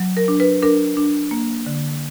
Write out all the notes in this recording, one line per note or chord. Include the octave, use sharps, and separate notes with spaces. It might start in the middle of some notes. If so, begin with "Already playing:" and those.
Already playing: F#3
A#4
D4
B4
D4 A#4
D4
A#3
D3